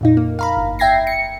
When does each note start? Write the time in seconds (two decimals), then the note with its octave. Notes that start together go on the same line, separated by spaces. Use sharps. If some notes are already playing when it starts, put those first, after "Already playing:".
0.01 F2 A#2 D#4
0.17 A#3
0.39 F5 A#5 B5
0.57 G1
0.79 E5 G5 G#6 A#6 C7
1.07 C#7